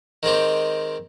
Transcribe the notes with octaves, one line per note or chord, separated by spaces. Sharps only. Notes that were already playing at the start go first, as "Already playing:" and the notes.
D#3 G#3 C4 G4